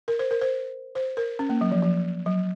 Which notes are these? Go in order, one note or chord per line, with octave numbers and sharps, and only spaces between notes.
A#4
C5
A#4
C5
C5
A#4
C#4
A#3
F#3
F3
F3
F#3